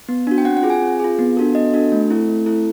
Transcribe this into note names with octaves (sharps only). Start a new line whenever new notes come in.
B3
D4 F#4
G5
C4 F#5
F#5
F4 G#4
G#5
C4
F4 G#4
B3
D4 F#4 A4
B3 D#5
D4 F#4 A4
A3
C4 E4 A4
A3
C4 E4 A4